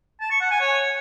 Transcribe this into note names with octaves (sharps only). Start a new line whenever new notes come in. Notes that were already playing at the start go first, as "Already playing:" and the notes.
A5
C#6
F#5
G#5
C#5